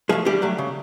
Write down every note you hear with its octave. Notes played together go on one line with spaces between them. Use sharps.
F3 G#3 A3 G#4
D3 G3 G4
F#3 A3
C#3